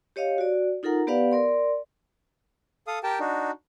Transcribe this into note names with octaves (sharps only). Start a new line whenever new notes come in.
G4 C#5 D#5 F5
F#4 D5
D#4 F4 A4 A#4 F#5 A#5
B3 G4 B4 D5 F5 F#5
A#4 D5 C6
A4 F5 D#6
G4 A#4 G5 A5
D4 D#4 F#4